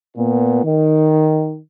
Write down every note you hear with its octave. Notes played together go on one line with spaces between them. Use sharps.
A#2 B3
D#3